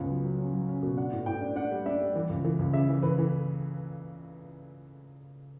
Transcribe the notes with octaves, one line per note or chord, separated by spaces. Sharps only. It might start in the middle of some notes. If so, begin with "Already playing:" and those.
Already playing: C#2 B3 C#4
F#3
F#3
C#4
F#3
C#4
B2
D4 F#5
A2
A2 G5
D4
D4 F#5
G3
D4 E5
G3
E3
C#2
E3
C#2
C#3 E5
E3
E3 B4
E3